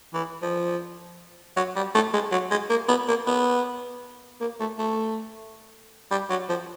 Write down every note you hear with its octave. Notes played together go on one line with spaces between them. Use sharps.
E3
F3
F#3
G3
A3
G#3
F#3
G#3
A#3
B3
A#3
B3
A#3
A3
A3
G3
F#3
F3